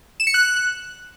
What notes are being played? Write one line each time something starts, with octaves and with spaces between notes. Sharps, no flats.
E7
C#7
F#6